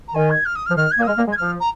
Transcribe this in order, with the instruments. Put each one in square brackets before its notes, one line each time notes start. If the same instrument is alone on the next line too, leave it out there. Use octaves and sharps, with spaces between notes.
[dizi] A#5
[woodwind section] D#3 [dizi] G#5
[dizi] G#6
F6
D#6
F6
[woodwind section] F3
[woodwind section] D#3 [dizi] F6
[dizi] G#6
[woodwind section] A#3
[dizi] D#6
[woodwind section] G#3 [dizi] F6
[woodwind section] A#3
G#3
[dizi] G#6
[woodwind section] F3 [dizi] F6
[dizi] A#5